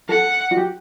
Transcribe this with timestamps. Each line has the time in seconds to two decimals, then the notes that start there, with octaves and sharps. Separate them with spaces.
0.09 A4 F#5
0.51 F#4
0.57 G4